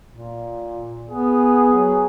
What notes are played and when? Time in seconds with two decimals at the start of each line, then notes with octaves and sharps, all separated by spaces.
0.11 A#2
1.10 B3 G#4
1.73 F#3